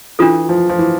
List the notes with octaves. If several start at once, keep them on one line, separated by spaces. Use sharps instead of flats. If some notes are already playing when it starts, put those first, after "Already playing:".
E3 D4 F4 A4
F3
F3
E3